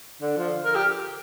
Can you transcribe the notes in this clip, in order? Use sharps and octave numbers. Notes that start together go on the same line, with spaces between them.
D3
F3
A#4
G4